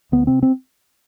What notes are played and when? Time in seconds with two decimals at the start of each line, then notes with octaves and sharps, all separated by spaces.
0.12 D2 B3
0.27 C3 C4
0.43 C4